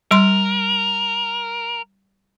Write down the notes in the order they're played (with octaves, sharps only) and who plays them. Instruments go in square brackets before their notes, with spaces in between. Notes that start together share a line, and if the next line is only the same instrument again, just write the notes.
[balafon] G3 C6 [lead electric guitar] A#4